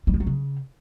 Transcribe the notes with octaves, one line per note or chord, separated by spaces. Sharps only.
G3
G#3
F#3
C#3